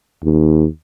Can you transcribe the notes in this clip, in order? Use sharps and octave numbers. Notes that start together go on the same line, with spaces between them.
D#2